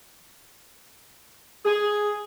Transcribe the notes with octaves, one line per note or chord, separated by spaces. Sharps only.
G#4